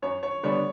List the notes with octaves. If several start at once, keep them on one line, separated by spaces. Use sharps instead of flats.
F#2 C#5
C#5
D3 G3 B3 D4 C#5